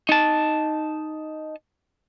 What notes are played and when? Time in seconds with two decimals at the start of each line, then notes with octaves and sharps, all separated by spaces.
0.09 D#4 A5